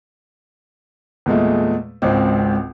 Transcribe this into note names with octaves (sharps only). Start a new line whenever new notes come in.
E2 A#2 G#3 A3
G#1 C#2 C4